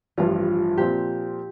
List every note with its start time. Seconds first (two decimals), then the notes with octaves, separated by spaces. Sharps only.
0.17 A1 G2 F3 F4
0.77 A#2 F3 C4 G4